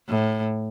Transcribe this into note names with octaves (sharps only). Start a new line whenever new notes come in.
A2